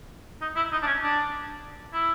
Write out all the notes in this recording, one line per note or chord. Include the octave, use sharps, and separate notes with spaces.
D#4
E4
D#4
D4
C#4
D4
E4